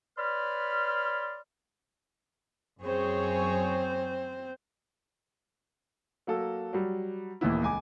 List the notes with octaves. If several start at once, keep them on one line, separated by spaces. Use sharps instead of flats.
B4 C#5 D5 B5 C6 F6
F#2 C4 G#4 C5 C#5
F#3 A#3 A4
F#3 G3
D#1 D#2 E3 B3 E4
C#2 G#5 D6